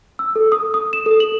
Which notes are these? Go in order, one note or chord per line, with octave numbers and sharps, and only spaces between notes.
E6
A4
D#6
D#6
E7
A4
F#7